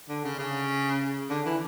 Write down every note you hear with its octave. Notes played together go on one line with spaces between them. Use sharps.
D3
C#3
C#3
D3
E3